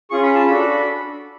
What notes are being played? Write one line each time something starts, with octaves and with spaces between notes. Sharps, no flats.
C#4 F4 G#4 C#6
B5
A5
D4 F#4 A4 B5